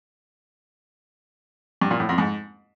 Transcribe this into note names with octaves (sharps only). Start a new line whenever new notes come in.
G2
A#2
A2
F2
G#2